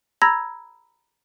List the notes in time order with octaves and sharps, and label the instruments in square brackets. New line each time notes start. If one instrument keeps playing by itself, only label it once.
[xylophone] A#5 B5 E6 G#6 A#6